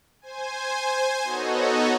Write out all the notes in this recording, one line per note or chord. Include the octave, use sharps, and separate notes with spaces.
C5 G#5
B3 D#4 F#4 A4 C#5 D#5